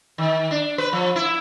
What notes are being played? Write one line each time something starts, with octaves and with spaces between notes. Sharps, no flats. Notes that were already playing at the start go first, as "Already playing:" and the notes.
D#3
D4
B4
F3
E4